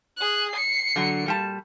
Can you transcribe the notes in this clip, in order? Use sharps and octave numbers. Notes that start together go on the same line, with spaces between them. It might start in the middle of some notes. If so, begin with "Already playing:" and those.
G#4 F#6
C7 C#7
D3 F#3
A#2 G3 A5